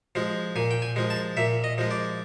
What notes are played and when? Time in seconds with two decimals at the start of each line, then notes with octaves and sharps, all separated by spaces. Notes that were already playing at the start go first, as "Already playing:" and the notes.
0.15 F3 G#3
0.56 A#2 G#5
0.71 G5
0.82 G#5
0.96 F3 G#3
1.10 A5
1.37 A#2 E5
1.64 D#5
1.78 F3 G#3
1.91 D5